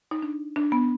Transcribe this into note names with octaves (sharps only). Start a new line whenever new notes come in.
D#4
D4
D4
B3